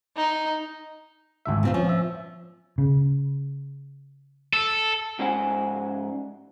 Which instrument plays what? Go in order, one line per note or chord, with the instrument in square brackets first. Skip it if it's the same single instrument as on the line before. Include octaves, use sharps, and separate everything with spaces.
[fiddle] D#4
[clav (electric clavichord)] G#1 D2 E5
[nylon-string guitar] A#2 C4 F4
[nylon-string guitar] F3 [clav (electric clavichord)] C#4
[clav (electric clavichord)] E5
[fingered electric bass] C#3
[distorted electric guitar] A4
[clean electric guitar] G#2 C#4 C5 F#5 G#5